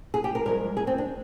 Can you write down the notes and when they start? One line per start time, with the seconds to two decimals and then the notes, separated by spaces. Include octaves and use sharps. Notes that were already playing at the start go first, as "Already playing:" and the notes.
0.14 G#4
0.24 G4
0.35 A#4
0.46 G2 F3 G#3 A#4
0.77 G#4
0.87 C4
0.98 D4